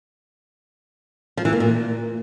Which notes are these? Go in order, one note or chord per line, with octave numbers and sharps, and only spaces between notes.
F3
E3
A#3
A#2